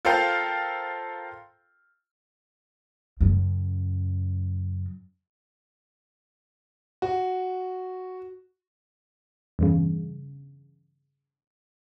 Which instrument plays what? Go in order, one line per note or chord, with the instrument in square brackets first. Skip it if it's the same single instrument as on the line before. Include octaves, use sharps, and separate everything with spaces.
[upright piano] F4 A4 A#4 C5 F5 G5
[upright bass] F#2 C#3
[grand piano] F#4
[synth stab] E2 G2 C#3